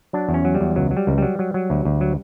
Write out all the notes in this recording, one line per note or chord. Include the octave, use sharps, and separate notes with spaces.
F#3 D4
E2
C#4
F#3
G3
E2
C#2 F#3
F#3
G3
C#2
F#3 G3
F#3
F#3
D2
D2
F#3